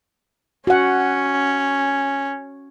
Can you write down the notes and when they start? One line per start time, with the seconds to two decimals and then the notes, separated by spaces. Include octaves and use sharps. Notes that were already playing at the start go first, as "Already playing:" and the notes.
0.67 C#4 F#4 F#5